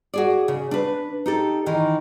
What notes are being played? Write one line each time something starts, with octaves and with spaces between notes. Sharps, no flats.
F#4 G#4 D5
C#3
D4 B4
D#4 G4 A4
D#3 E3